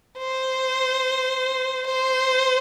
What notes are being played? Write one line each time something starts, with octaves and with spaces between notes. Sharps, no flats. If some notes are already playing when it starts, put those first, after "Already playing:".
C5
C5